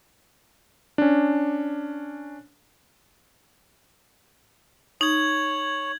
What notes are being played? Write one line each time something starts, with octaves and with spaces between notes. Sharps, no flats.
C#4 D4
D#4 C#5 G#6 F#7